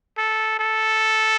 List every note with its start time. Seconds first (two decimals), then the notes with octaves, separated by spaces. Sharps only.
0.18 A4
0.59 A4